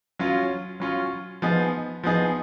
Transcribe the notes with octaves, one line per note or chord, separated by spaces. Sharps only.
F#3 C#4 F4
F#3 C#4 F4
F3 B3 D#4 G#4
F3 B3 D#4 G#4